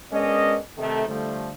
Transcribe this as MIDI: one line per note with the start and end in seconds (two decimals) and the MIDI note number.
0.12 0.57 56
0.12 0.57 59
0.12 0.57 61
0.12 0.57 62
0.12 0.57 70
0.12 0.57 75
0.78 1.05 48
0.78 1.05 51
0.78 1.05 57
1.08 1.51 50
1.08 1.51 53
1.08 1.51 55
1.08 1.51 57